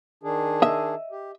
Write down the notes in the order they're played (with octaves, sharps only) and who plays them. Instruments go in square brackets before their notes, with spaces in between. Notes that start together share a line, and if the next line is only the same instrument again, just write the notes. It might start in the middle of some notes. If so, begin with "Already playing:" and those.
[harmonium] D#3 D4 G#4
[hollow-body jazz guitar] D#5 E5
[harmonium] G4